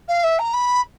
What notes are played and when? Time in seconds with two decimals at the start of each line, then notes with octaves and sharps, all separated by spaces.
0.08 F5
0.24 E5
0.39 A#5
0.53 B5